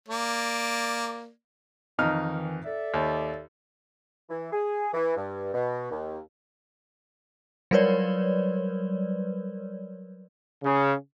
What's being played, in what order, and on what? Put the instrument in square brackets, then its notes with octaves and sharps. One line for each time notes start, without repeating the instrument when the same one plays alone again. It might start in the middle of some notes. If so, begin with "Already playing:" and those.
[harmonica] A#3 D5
[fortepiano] F2 D#4 F6 [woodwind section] D#3 E3
[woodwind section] A4 D5 E5
[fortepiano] D#2
[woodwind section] E3
G#4
E3
G2
B2
D#2
[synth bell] F#3 G3 A#4 B4 C#5 D5
[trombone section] C#3